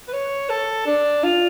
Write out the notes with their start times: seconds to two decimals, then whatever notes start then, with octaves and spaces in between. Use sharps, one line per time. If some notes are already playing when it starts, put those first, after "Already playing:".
0.08 B4
0.13 C#5
0.49 A4
0.86 D4
1.23 F4